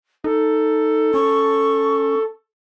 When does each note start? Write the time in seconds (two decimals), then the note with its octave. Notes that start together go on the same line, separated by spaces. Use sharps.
0.24 D#4 A4
1.14 C#4 C#6